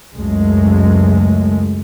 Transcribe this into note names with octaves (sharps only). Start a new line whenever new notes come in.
C#2 F#2 G#3 A3